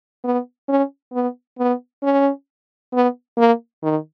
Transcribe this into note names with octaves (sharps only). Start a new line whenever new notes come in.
B3
C#4
B3
B3
C#4
B3
A#3
D#3